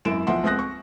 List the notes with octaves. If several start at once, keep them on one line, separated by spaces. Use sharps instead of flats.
G#1 F#2 E4 D7 E7
B1 F3 E5 F#5 C6
C#2 C4 D#6 F#6 A#6
C#6